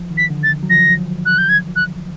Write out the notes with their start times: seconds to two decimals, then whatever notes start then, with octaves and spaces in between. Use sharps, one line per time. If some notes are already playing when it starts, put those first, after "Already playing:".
Already playing: F3
0.10 D#3
0.18 B6
0.30 D3
0.43 A6
0.63 F#3
0.70 F3 A#6
1.26 F#6
1.38 G6
1.49 G#6
1.76 F#6